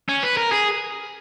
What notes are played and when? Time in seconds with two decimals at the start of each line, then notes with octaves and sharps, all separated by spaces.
0.09 C#4
0.23 B4
0.37 A#4
0.52 G#4